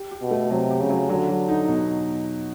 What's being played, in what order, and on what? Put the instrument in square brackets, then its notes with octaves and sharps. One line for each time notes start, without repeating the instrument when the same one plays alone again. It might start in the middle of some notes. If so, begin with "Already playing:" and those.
Already playing: [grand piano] G4
G4
[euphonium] B2
[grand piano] A3
[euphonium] C3 [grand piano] F#3
[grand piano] G4
[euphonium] C#3
[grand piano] F#3
[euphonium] D3 [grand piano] F#3
[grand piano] F#3
D#4
B2